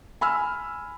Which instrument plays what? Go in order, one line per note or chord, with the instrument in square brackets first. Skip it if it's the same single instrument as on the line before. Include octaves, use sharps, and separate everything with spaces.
[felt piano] G#5 B5 E6 F6